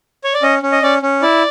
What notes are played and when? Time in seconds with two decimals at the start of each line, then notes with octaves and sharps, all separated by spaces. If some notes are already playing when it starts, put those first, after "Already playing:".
0.24 C#5
0.34 D5
0.43 C#4 D#5
0.63 C#4
0.72 D#5
0.82 C#4 D5
1.02 C#4
1.22 E4 D5